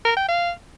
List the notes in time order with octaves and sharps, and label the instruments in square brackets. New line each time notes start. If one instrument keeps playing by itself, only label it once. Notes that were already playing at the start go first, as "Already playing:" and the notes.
[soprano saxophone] A#4
G5
F5